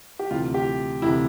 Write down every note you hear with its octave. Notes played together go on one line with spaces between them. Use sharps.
G4
D2 C3 E3 F4
G4
D2 C3 E3 E4